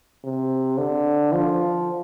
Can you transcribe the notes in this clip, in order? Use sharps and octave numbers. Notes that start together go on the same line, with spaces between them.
C3
D3
F3